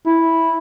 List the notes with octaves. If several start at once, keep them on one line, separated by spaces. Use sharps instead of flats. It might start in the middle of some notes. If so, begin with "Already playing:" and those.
E4